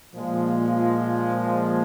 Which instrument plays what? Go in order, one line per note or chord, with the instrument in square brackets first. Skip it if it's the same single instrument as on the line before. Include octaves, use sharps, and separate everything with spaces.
[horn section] A#2 F3 G#3